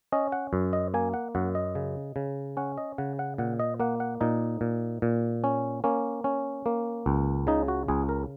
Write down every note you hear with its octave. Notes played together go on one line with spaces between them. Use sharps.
C#4 D#5
F#5
F#2
D#5
A#3 G#5
F#5
F#2 F#5
D#5
C#3
C#3
C#4 F#5
D#5
C#3 F#5
F#5
A#2 F#5
D#5
A#3 F#5
F#5
A#2 D#4
A#2
A#2
C#4
A#3 C#4
C#4
A#3
C#2
C#3 D#4
F#4
C#2 G#4
A#4